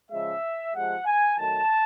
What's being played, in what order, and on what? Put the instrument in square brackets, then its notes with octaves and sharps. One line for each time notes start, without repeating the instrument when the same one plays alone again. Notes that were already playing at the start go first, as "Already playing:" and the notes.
[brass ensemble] C#3 F3 G#3 E5
C3 F3 G#3 F#5
G#5
D#3 F#3 A3 A5